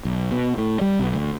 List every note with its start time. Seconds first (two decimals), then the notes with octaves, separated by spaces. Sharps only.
0.05 B1
0.31 B2
0.57 A2
0.81 G3
0.99 B1
1.14 D2